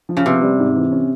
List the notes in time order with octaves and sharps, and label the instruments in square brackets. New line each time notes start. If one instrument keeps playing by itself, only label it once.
[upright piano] F3
[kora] C#3
[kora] C3 [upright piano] B3
[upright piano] G3
G#2
E3
C#4